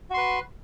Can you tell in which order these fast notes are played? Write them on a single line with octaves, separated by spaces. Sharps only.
F#4 C6 B4